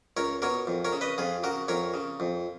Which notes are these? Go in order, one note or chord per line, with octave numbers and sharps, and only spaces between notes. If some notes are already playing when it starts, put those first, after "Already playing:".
C#2 A#4 C#5
B2 A#4 C#5
F2
A#4 C#5
C#3
B4 D#5
F2 F4 G#4
C#3 F#4 A#4
F2 A#4 C#5
C#3
F2